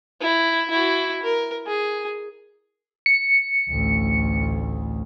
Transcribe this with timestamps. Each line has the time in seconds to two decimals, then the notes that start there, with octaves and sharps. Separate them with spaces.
0.21 E4
0.70 E4 F#4
1.23 A#4
1.67 G#4
3.06 C#7
3.70 A1 D2